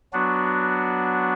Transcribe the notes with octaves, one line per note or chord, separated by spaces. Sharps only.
F#3 B3 D4 F#4